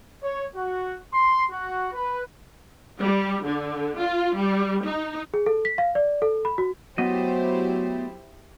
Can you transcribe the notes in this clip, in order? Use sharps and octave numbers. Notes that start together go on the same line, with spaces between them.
C#5
F#4
C6
F#4
B4
G3
D3
F4
G3
D#4
G#4
A4
B6
F5
D5
A4
B5
F#4
F#3 A3 B3 E4 G4 C5 D#5